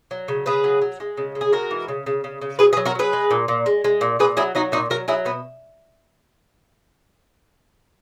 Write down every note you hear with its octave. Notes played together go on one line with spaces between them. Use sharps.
F#3
C#3
C#3 G#4 B4
F#3
F#3
G#3
C#3
G#3
G#4
G#3 F#4 A#4
E3
C#3
C#3
C#3
C#3
F#3 G#4 B4
G#4 B4
F#3
F#4 A#4
F#3 G#4 B4
G#3
A#2
A#2
G#3
G#3
A#2
A#2 G#4 B4
F#3 E4 G#4
F#3 D#4 F#4
A#2 D#4 F#4
F#3 F#4 A#4
F#3 E4 G#4
B2 B3